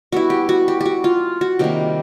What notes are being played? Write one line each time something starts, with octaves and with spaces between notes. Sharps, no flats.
G3 B3 E4 F#4
G4
F#4
G4
F#4 G4
F4
F#4
C3 D#3 G3 A#3 G4